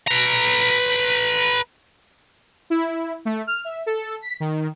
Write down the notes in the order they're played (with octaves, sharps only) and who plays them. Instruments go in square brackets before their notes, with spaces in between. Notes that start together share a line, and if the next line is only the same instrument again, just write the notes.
[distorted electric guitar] B4 A#5
[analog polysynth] E4
A3
F6
E5
A4
B6
D#3